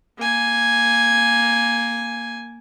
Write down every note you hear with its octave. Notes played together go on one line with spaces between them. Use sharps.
A#3 G#5